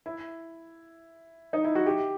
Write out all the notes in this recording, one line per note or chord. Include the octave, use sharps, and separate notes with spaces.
E4
D#4
E4
F#4
G4